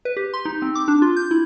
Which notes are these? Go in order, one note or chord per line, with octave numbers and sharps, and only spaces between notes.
B4
G4
C6
D#4
C4
D6
D4
F4
G6
E4